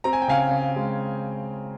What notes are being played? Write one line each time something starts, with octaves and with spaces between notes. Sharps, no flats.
C4 A#5
G#5
G5
C#3 F5 G#5
C#3
G#3